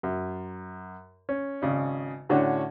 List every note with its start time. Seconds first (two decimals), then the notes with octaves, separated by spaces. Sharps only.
0.03 F#2
1.29 C#4
1.62 G#1 C#3 D5
2.30 A2 D3 C#4 F#4 C#5 D5